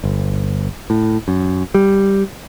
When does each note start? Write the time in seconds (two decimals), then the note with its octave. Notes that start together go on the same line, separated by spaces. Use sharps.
0.04 G1
0.90 A2
1.28 F#2
1.75 G3